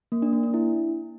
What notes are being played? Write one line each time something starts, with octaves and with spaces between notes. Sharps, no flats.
A#3
D4
A#3
D4
E4